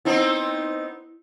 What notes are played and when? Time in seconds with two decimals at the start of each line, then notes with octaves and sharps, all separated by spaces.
0.05 B3 C4 D#4 E4